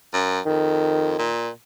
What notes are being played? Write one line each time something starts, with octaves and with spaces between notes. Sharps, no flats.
F#2
F2 D#3
A#2